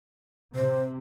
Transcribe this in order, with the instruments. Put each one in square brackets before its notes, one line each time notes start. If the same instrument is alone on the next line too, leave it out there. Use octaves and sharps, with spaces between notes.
[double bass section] C3 [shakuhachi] C5